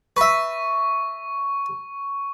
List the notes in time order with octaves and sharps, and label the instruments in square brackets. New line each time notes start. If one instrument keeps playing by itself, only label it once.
[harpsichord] B4 E5 [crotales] C#6